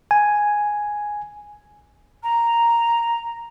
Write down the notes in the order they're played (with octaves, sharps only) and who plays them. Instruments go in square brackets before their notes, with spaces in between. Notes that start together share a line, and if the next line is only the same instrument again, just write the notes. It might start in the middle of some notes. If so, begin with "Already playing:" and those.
[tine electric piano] G#5
[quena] A#5